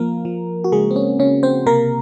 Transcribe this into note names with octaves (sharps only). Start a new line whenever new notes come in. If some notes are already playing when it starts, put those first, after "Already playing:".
Already playing: F3 A#3 A#4
F3
F#4
C#3 G#3 G#4
C4
C#4
C#3 C#4
C4 C5
C3 A#3 A#4